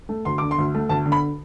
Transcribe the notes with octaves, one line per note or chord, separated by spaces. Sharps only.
A3
D2 C6
D3 D6
C6
D2
A3
D2 A5
D3
B5